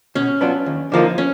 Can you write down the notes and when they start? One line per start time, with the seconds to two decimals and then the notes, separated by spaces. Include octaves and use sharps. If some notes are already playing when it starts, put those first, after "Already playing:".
0.15 B2 C#4
0.41 F#3 B3 D4 F4
0.66 D#2
0.92 D3 F3 A#3 D#4
1.18 C#4